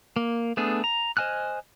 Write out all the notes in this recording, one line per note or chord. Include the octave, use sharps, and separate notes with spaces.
A#3
A3 B3 D4 G#4
A#5
C5 D#5 G#5 F6 F#6